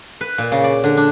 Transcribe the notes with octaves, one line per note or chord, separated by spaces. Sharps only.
B4
A#2
C#3
D5
D3
D4